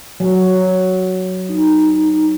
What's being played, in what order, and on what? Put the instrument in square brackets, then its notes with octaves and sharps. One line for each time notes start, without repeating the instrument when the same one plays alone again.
[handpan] F#3
[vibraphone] D#4